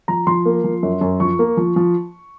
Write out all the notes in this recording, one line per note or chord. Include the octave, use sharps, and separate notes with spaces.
F3 A#5
F3 C6
A#3
F3
F#2
F#2
F3 C#6
A#3
F3
F3